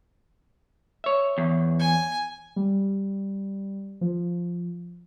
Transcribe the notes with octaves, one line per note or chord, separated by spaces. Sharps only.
C#5 E5
E2
G#5
G3
F3